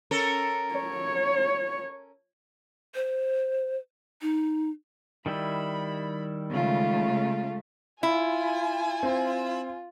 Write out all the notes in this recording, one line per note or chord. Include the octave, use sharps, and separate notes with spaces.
C#4 A4 A#4
C#5
C5
D#4
D#3 G3 E4 B5
C#3 G#3 A3 F4
E4 F4 G#5
C4 F4